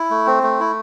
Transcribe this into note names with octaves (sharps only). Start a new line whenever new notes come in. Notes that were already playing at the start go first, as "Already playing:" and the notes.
Already playing: E4
A3
C4
A3
E4